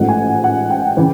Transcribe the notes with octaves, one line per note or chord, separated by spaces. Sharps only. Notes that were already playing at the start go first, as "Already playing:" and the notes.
Already playing: A1 G#2 F3 A3 F#5
G#5
F#5
G5
C#3 E3